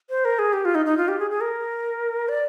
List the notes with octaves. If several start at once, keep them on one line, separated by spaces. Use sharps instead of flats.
C5
A#4
G#4
G4
F4
D#4
D#4
F4
G4
G#4
G#4
A#4
D5